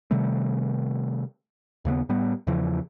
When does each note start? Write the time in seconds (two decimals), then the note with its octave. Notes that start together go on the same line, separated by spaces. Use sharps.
0.11 C3 D#3 G3 A3
1.85 D#2 C#3 A3 B3
2.09 A2 G3 B3
2.47 E2 C#3 E3 F3